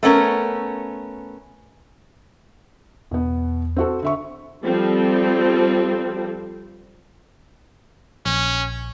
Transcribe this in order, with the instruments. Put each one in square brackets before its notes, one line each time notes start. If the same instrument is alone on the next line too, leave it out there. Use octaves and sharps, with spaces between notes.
[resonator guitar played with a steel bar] A3 B3 C#4 A#4
[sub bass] E2 [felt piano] B2 B3
[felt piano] C4 F#4 A4
D3 E5 C#6
[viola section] F3 G3 C4 A4
[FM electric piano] A#1 [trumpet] C#4